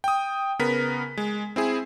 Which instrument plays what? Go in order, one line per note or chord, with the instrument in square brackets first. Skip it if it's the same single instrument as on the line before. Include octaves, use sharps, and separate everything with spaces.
[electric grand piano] G5 D#6
C#3 B3 A#4 B6
G#3
C4 E4 G#4